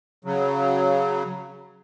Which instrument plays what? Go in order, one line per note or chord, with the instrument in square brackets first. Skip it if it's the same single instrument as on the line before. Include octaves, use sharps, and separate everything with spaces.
[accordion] C#3 F#3